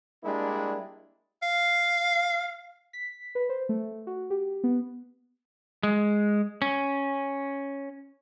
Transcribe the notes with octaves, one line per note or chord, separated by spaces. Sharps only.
G3 G#3 A#3 D4 E4
F5
B6
B4
C5
A3
F#4
G4
B3
G#3
C#4